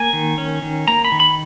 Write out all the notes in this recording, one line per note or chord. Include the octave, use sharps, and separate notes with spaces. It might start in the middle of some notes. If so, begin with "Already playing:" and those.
Already playing: A#3 G#5
D#3
C#4
D#3
A#3 A#5
B5
D#3
B5